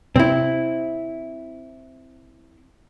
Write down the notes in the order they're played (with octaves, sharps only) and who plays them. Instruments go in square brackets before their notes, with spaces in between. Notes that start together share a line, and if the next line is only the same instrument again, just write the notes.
[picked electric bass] C3 [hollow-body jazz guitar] C4 E4